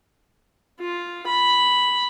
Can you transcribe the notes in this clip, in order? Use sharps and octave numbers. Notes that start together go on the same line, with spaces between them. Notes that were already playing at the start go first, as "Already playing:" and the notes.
F4
B5